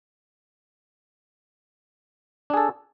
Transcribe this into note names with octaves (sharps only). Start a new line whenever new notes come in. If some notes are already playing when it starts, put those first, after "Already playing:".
D4 G#4 A4